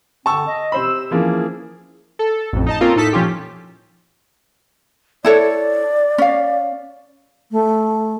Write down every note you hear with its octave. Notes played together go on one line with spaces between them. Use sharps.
D3 C4 A5 C#6 E6
D#5
C3 C5 B5 E6
E3 F3 A#3 C#4 G#4
A4
A1 F2
D#4 D#5 A5
A#3 C4 C#4 F4 A4 A#4
A2 D#4 A4 A5 B6
A#2 F3 C#4 F4 G4
E4 A4 C#5 D5
C#4 F5
A3